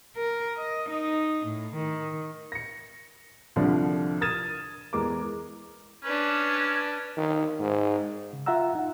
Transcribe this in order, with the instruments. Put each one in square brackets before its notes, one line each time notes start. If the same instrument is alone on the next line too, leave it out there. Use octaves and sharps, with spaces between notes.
[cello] A#4
D#5
D#4
A2
D#3
[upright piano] A#6 C#7
C2 D3 F3 D4
D#6 F6 G#6 A6 D#7 E7
E2 G#3 A#4 D6
[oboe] C#4 [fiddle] D4 B4
[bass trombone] D#3
G#2
[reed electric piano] C#3
F4 E5 F#5 A#5 E6
D#4 F#5